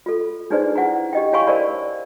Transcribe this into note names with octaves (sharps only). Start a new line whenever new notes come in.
F4 A4
D4 D#4 G#4 B4 C5 D5
E4 F#5 G#5 A#5
G4 D#5 G5
E4 C#5 F5 G#5 B5 C#6
A#4 C5 D5 A5 B5